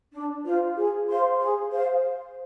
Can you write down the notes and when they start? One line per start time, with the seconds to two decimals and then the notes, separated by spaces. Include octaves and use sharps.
0.12 D4
0.44 F4 C5
0.75 G#4
1.07 C5 F5 C6
1.38 G#4
1.71 C5 F5